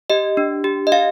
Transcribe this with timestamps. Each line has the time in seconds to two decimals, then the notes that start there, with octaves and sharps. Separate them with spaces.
0.10 G4 D#5
0.37 D4
0.64 G4
0.87 D#5
0.92 G4 F5